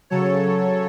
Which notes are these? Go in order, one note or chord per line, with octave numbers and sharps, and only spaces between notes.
C#3 F#3 A4 C#5